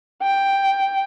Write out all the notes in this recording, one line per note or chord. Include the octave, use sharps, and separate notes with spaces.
G5